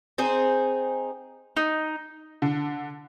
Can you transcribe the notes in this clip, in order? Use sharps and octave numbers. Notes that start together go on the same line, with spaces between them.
C4 D#4 G#4 C5
D#4
D3